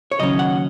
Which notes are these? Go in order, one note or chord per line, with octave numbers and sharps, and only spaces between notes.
C#5
D#2 C#3 F#3 C#4 D#5
F#5